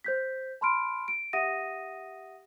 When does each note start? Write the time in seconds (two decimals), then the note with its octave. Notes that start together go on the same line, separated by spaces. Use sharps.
0.04 C5 G6 B6
0.61 A5 B5 C6 F6 D7
1.08 D7
1.33 G4 E5 F#5 D#6 A#6 D#7